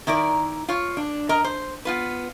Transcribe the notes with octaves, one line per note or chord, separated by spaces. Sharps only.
D#3 E4 A#4 D5
F4 C#5
D4
A#4 D#5 A#5
C5
B3 F4 B4